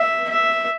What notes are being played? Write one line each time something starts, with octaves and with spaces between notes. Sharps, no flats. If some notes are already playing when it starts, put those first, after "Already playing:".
Already playing: E5
E5